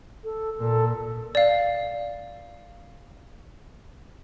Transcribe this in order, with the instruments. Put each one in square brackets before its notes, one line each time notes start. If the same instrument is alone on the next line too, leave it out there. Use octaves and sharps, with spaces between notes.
[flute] A4
[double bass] A#2 [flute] A4
[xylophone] D5 F5